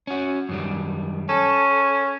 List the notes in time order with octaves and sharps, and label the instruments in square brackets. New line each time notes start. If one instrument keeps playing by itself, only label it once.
[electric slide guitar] C#4 F#4
F#2 D#3 G3
[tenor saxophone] C#4 [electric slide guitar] A4